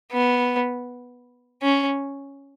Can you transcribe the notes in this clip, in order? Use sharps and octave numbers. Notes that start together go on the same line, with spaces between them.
B3
C#4